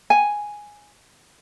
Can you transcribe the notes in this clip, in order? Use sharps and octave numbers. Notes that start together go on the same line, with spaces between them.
G#5